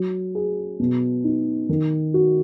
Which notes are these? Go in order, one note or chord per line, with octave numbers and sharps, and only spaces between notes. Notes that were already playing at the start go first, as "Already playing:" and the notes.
Already playing: F#3
G#4
B2
D#4
D#3
F#4